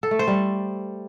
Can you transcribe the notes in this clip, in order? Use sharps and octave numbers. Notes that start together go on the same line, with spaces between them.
A4
A3
C5
G3